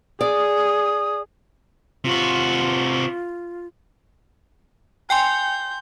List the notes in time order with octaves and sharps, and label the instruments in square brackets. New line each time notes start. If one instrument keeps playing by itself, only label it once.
[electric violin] G#4 [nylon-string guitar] D5 [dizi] D#6
[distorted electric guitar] C3 F#4 [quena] F4
[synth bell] G5 G#5 C6 [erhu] G6